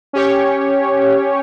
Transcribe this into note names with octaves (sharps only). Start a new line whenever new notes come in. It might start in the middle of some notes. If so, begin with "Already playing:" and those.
C#4 G4 C#5